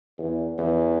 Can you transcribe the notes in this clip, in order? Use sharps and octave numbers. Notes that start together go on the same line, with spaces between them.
E2
E2